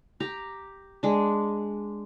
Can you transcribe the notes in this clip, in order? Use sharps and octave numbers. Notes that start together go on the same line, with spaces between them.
G4 A#5
G#3 D4